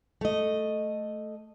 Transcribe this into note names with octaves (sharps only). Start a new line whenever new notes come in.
A3 D#5